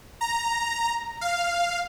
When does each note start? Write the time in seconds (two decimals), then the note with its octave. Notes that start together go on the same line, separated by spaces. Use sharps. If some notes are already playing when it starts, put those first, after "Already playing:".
0.21 A#5
1.21 F5